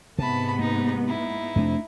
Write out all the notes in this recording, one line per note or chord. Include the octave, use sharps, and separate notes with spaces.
G#2 C3 B3 A5 B5
A#3 D#4
D#4 E4
F2 C3 A3 A#3 D4